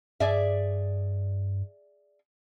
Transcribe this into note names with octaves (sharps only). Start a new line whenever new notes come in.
G2 G#4 D5 E5